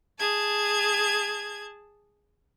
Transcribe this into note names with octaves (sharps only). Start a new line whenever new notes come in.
G#4 A5 G#6